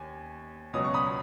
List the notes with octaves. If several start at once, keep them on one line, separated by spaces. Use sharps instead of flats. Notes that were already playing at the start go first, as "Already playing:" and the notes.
Already playing: D#2 G#5
C#2 B2 F#3 D#6
C#6
B5 D#6